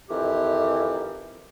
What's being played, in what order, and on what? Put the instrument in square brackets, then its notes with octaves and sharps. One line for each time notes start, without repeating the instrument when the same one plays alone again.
[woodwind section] F2 D#3 E3 G4